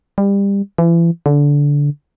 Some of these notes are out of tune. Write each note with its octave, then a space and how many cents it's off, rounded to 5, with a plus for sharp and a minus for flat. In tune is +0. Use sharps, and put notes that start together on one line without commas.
G3 +25
E3 +35
D3 -20